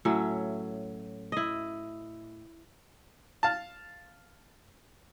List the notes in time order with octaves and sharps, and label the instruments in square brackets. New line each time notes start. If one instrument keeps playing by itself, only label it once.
[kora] A2 F#3 C#4 E5
E4 D#5
[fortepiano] F5 A5